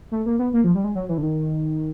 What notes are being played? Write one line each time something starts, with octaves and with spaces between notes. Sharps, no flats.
A3
A#3
B3
A#3
F3
G3
G#3
F#3
E3
D3
D#3